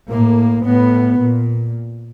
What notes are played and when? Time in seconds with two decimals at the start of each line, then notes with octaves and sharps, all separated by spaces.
0.09 A2 A#3
0.64 A2 B3
1.19 A#2